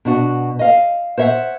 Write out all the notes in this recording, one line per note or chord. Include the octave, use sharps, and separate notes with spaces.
B2 D4 F#4
D#5 F5
C5 C#5 E5 F#5